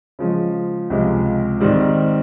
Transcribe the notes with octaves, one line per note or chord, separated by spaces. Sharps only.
C#3 F3 G#3
C#2 C3 F3 G#3
G#2 D#3 G3 C4